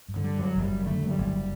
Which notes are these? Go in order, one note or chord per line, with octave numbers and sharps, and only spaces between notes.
G2
D3
G3
F#2 F#3
F#1
G3
F#2
D3 A3
F#2
G3
F#1